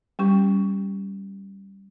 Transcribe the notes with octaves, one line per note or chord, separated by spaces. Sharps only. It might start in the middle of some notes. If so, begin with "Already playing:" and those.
G3 C#4 G4